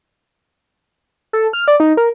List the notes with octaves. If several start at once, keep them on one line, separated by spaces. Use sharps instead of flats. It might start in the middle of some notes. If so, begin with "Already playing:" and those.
A4
F6
D5
D#4
A#4